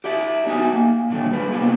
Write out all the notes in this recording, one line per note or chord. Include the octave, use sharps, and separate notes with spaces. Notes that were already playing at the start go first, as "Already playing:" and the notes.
G4 D5 E5
B3 D#4 F#4 C#5 G#5
A#3
A#2 D3 D#3 G3 A3
G3 G#3 B4
C3 A#3 B3 D#4 F4 G#4